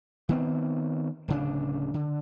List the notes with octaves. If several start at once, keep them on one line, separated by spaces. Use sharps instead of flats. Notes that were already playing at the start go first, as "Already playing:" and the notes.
D#3 B3 C4
D1 C#3 D4
D3